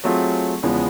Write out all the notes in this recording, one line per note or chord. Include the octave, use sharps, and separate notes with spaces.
F#3 A3 C4 F4 G#4
E2 C#3 F3 G#3 B3